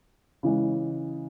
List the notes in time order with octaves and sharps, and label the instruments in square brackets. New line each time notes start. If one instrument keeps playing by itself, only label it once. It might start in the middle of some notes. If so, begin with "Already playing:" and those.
[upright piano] C#3 E3 G#3